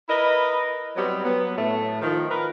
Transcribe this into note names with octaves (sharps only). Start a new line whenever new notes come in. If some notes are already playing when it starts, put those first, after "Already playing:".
E4 A#4 B4 D#5
F#3 G3 B3 C4 G4
F#3 B3
A2 A3
D#3 F3
A#4 B4